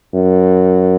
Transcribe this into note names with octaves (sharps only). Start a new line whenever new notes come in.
F#2